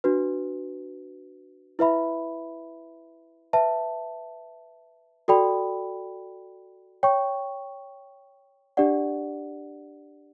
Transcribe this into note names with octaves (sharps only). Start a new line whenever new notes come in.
D4 F#4 B4
E4 B4 E5 B5
B4 E5 A5
F#4 A4 D5 G5 B5
C#5 G5 C#6
D4 G4 D5 F#5